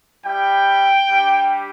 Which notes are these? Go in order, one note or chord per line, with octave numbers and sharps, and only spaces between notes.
G3 E4 G4 G5
G3 D4 G4